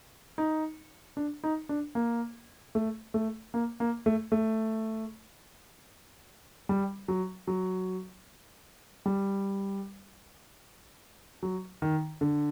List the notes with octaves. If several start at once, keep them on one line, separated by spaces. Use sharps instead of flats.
D#4
D4
D#4
D4
A#3
A3
A3
A#3
A#3
A3
A3
G3
F#3
F#3
G3
F#3
D#3
D3